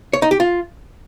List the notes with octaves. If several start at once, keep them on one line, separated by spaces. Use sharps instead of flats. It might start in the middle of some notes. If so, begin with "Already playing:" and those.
C#5
D#4
G4
F4